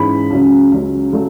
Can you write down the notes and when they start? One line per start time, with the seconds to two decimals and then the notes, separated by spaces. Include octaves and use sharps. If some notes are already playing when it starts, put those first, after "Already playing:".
Already playing: G#2 E3 G#3 C#4 B5
0.30 C#2 C#3 F#3 C#4
0.72 C#2 C#3 F#3 C#4
1.13 C#3 F#3 A3 C#4